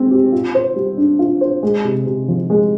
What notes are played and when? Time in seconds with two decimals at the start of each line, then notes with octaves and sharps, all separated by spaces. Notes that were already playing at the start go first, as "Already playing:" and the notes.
Already playing: G#3 C4
0.11 G4
0.32 F4
0.55 C5
0.76 G3
0.97 D4
1.19 F4
1.41 C5
1.63 G#3
1.84 C3
2.06 C3
2.28 F3
2.50 G#3